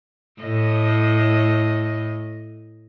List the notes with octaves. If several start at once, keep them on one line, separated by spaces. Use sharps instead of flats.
A2 D#5